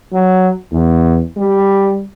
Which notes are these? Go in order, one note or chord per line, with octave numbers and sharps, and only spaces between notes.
F#3
E2
G3